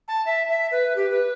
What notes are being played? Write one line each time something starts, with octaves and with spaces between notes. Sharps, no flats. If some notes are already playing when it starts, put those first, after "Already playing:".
A5
E5
E5
B4
G4
B4